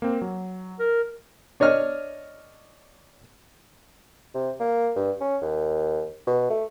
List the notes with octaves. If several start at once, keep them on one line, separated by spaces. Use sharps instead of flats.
A#3 C4
F#3
A#4
D4 C#5 D#5 F6
C3
A#3
G2
C#4
D#2
B2
A3